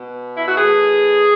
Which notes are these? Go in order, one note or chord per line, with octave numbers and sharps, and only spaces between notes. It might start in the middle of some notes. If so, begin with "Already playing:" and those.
Already playing: B2
E4
F#4
A2 E3 G#4